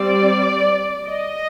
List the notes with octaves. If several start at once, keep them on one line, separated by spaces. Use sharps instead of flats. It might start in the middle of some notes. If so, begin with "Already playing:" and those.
Already playing: G3 C4 D5
D#5